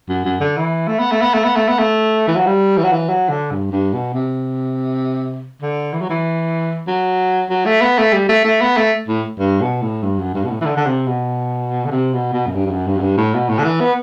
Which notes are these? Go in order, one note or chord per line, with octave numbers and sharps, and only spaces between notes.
F#2
F#2
D3
E3
A3
B3
A3
B3
A3
B3
A3
B3
A3
E3
F#3
G3
E3
F#3
E3
F#3
D3
G2
G2
B2
C3
D3
E3
F#3
E3
F#3
F#3
A3
B3
A3
G3
A3
A3
B3
A3
A2
G2
B2
A2
G2
F#2
G2
B2
A2
E3
D3
D3
C3
B2
D3
C3
B2
B2
F#2
G2
G2
F#2
G2
F#2
G2
A2
B2
A2
D3
E3
B3